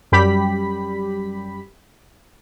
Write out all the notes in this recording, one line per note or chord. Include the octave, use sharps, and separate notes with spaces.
F#2 G3 G4 B5 B6